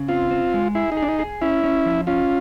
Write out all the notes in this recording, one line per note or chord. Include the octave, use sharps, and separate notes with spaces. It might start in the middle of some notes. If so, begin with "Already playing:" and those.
Already playing: C#3
C4 F4
C4
G#3
E4 G#4
D#4
G#4
D4
D#4
G#4
C#4 E4
C#4
F3
C#4 F4